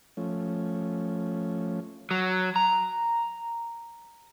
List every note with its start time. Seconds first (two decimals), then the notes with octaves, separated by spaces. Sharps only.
0.17 F3 A3 C#4
2.11 F#3
2.56 A#5